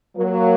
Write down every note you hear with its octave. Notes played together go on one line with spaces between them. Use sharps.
F#3 A#3